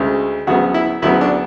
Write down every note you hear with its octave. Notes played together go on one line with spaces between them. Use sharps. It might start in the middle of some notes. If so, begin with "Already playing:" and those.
Already playing: D2 C#3 G#3
D2 C#3 F#3 B3 F#4
E4
D2 C#3 F#3 B3 E4
D4